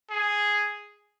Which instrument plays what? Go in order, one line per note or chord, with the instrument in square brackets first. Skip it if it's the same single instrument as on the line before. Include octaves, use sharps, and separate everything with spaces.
[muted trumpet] G#4